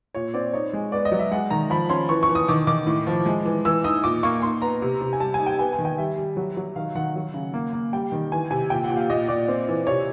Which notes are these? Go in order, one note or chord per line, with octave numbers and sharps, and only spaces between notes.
A#2 C#5
C4 D5
D#4 C#5
G#3
B3 D5
D#5
F#3
E5
G#3 F#5
D#3 A#5
F3 B5
C#4 C6
E3 C#6
C#6
E3
D#6
D#3 D6
D#3 D6
A2
F3
G#3
E3
E3 E6
D#4 D#6
A#2 D6
A#3 C#6
D#4 C6
B3 A#5
C3
C3
G#5
G3 A5
G#5
D#4
G5
B3 G#5
G#5
D#3
G5
G3 E5
G3
F#3
F#3
D#3 F5
D#3 F#5
F#3
C#3
A#3
A#3
G3 G5
D#3
E3 G#5
C3 G#5
A#2 G5
F#5
A#2
F5
A#2 D#5
A#2 D5
C4
E3
C3 C#5